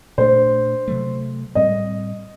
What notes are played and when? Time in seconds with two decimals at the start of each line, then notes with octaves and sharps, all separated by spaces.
0.18 A#2 A3 D4 C5
0.88 C3 F#3 A3
1.55 A2 G3 C4 D#5